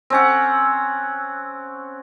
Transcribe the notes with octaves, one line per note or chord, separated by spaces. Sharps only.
C4 C#4 F#5